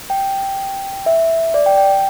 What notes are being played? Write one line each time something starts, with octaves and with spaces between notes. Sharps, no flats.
G5
E5
D5
G5
G5